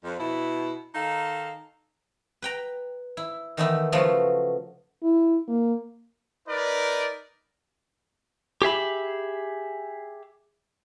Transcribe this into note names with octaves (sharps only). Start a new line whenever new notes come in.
F2
B2 E4
D#3 D#4 A4 F5
B4 G5 A#5
E4
D#3 E3 A3 B3 D#4 E4
C#3 F3 F#3 A3 B3
E4
A#3
D#4 A#4 B4 D5
G4 G#4 E5 B5